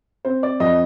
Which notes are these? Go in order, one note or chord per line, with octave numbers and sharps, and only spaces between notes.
C4 C5
D5
F2 D#5